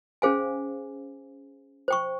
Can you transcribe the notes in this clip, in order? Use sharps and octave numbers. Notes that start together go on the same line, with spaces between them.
C#4 G#4 C5 F5 G#5
C5 G5 C#6